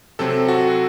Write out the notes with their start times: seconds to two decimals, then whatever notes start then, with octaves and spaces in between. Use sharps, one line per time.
0.19 C3 F#3 C4 A4
0.48 F#4